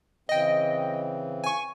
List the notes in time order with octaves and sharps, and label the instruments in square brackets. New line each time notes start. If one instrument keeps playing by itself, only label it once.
[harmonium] C#3 E3 C4 [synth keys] D#5 G5
[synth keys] G#5 C#6